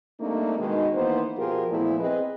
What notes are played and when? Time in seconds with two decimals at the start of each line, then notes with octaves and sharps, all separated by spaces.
0.20 G3 A3 A#3 C4 D4 D#4
0.58 B2 D#3 G#3
0.94 D#3 E3 A#3 B3 C5
1.37 B2 F3 F4 G4 G#4 A#4
1.70 E2 A#2 F3 A3 B3 E4
2.00 C4 G#4 B4 D#5